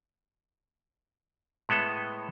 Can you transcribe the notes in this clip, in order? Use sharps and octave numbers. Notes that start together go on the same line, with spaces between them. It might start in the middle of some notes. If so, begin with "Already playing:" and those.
A2 G#3 B3 A4